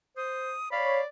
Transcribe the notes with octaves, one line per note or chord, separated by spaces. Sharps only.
C5 D#6
C#5 D5 F5 B5